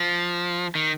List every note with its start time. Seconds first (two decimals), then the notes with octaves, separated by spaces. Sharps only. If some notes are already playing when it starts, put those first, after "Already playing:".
Already playing: F3
0.75 D#3